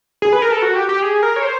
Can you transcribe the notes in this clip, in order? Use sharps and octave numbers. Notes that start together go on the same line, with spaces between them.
G#4
B4
A#4
A4
F#4
G4
G4
G#4
A#4
C#5
C5